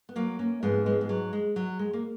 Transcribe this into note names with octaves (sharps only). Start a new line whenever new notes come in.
B3
F#3 A#3
A#3 C#4
G#2 F3 G#3 B3
G#3 B3
G#3
F#3
G#3
F#3
G#3
A#3